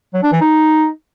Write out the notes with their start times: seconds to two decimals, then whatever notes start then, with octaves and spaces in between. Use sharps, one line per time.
0.14 F#3
0.23 D4
0.32 E3
0.41 D#4